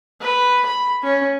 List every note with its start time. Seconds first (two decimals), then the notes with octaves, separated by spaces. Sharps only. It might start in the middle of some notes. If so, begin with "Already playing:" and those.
0.21 B4
0.66 B5
1.03 C#4